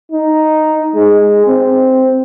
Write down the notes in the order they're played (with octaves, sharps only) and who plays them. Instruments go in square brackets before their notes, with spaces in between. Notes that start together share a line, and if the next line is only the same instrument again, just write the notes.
[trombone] D#4
G#3
C4